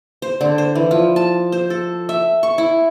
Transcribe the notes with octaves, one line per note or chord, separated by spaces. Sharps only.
C5
D3
C5
E3
F3
A5
C5
A4
E5
C#6
E4